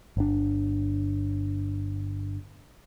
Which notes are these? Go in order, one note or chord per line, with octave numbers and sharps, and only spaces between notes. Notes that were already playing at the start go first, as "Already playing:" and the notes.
G1 D4